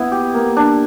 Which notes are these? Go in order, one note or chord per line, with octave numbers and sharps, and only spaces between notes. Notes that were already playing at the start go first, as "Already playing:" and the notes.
Already playing: B3 E4
G4
A#3
D4